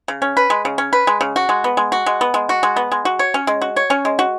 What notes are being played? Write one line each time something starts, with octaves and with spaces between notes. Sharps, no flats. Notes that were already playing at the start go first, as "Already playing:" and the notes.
C#3
C#4
B4
G#3
C#3
C#4
B4
G#3
C#3
F#4
G#3
B3
G#3
F#4
G#3
B3
G#3
F#4
G#3
B3
G#3
F#4
C#5
C#4
G#3
F#4
C#5
C#4
G#3
F#4